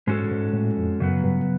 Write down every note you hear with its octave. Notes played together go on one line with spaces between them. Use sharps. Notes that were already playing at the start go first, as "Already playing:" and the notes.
G#2 G#3 C#4 F#4 A4
G#2
A2
F2
F#2 C#3 F#3 B3
G2